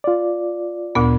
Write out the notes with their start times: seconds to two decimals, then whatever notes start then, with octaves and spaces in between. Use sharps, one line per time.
0.04 F4 D5
0.95 D2 A#2 B3